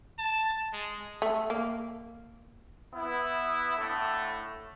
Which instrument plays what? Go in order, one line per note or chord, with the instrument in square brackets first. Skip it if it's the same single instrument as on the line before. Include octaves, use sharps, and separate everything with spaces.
[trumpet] A5
G#3
[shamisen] A3
A#3
[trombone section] B3 E4
A2 D3 A3